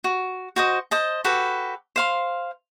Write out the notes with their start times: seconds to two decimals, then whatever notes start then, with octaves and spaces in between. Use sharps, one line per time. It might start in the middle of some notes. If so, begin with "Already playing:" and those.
0.04 F#4
0.56 F#4 C5 D#5
0.91 C5 D#5 A5
1.24 F#4 G4 A4 B4
1.96 C5 F5 C6